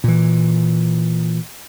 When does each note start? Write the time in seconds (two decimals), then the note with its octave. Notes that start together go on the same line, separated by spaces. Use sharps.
0.04 A#2 E3